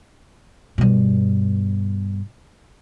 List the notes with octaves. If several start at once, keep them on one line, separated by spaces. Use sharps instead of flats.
G2 B2